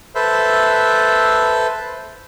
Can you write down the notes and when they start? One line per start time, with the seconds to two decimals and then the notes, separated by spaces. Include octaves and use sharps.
0.15 A4 B4 C5 E5